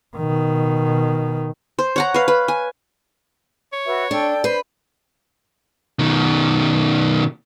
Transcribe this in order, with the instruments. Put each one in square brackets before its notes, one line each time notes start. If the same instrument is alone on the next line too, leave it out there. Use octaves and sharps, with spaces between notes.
[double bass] B2 D#3
[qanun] C5
C#5 F#5 A#5
B4 F5
B4
G#5
[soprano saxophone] C#5
[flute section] F#4 B4 E5
[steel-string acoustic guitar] D4 [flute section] A4 G5
[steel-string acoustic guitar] B4 [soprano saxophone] C5
[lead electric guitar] B2 D#3